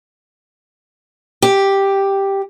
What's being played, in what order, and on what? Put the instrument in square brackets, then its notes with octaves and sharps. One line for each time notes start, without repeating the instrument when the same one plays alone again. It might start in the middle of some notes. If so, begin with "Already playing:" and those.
[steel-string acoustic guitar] G4